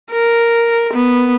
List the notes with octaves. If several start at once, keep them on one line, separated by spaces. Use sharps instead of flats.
A#4
B3